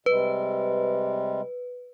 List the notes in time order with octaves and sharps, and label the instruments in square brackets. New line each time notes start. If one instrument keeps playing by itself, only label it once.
[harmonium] C3 G3 G#3 [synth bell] B4